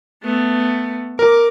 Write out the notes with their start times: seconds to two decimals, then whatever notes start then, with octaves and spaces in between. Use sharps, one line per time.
0.23 A3 B3
1.19 A#4 D6